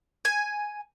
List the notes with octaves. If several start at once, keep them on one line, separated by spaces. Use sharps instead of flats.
G#5